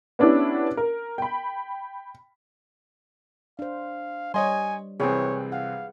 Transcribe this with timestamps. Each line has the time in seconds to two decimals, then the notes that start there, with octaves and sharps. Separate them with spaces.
0.19 B3 C#4 D4 E4 G4
0.77 A#4
1.18 G5 B5
3.59 D4 C5 F5
4.34 G3 C#5 D#5 G#5 C6
5.00 C2 E3 C4 G#4 B4 C#5
5.52 F5 F#5